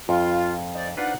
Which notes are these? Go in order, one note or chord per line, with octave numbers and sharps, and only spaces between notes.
F2 F4
D#4 C5 D5
F3 D4 D#4 F4 B4 F#5